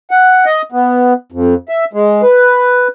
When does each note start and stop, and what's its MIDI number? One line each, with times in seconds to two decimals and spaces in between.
0.11 0.45 78
0.46 0.62 75
0.72 1.13 59
1.32 1.54 41
1.69 1.85 76
1.93 2.22 56
2.22 2.88 71